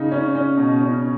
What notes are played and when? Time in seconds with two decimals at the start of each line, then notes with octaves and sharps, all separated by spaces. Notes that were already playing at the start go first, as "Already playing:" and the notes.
Already playing: C#3 D#4
0.12 C#4
0.35 C#4
0.57 B2
0.81 C#4